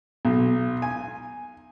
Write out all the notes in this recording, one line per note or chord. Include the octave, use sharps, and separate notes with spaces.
B1
G#5